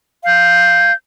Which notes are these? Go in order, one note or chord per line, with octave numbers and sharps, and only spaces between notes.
F5 G6